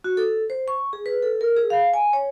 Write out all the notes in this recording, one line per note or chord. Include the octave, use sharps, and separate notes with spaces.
F#4
A4
C5
C#6
G#4
B4
A4
A#4
G#4
F5
G#5
C#5